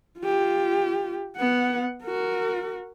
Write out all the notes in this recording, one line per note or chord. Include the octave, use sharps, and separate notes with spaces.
F4 G4
B3 F#5
F#4 A#4